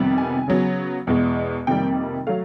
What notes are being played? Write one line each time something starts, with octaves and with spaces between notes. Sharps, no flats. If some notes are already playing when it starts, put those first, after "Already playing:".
Already playing: F2 C3 D#3 G3 B3
G#5
C#3 F#3 B3
E2 B2 G#3
F2 C3 D#3 G3 A#3 G5
F#3 A3 F5